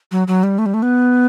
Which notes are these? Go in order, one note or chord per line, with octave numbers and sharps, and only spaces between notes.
F#3
F#3
G3
A3
G3
A3
B3